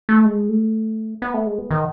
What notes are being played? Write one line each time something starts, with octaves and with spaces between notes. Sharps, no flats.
A3
G#3
A3
B3
A3
G#3
B3
D#3